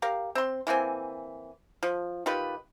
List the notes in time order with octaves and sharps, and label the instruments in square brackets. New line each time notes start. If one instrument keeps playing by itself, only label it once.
[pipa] G4 A#4 F5
C4 C6
E3 A#3 C4 G#5
F3
D#3 F4 G4 B4